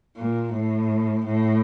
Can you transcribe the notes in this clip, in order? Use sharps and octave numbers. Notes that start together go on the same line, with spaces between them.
A#2
A2
A2